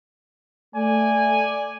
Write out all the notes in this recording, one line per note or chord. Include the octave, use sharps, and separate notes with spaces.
A3 D5 G#5